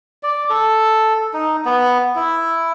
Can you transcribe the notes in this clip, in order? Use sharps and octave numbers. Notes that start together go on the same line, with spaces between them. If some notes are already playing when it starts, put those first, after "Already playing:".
D5
A4
D#4
B3
E4